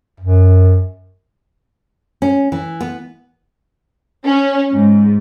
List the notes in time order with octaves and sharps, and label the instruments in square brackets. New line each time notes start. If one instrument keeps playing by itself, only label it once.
[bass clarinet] F#2
[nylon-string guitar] C#4
E3
B3
[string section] C#4
G#2